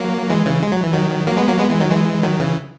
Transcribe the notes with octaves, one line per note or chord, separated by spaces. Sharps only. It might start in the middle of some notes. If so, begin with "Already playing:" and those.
Already playing: F#3 A#3
E3 G#3
C#3 E3
G#3
F#3
E3
D#3 F#3
F#3 A#3
G#3 B3
F#3 A#3
G#3 B3
E3 G#3
D#3 F#3
E3 G#3
D#3 F#3
C#3 E3